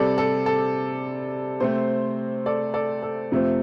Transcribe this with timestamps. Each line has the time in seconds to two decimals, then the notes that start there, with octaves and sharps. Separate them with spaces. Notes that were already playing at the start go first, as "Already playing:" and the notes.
Already playing: C3 G3 C4 A4 D5
0.18 A4
0.46 A4
1.60 C3 A3 C4 C5
2.46 A4 D5
2.74 A4 D5
3.02 A4
3.32 F2 C3 A3 C4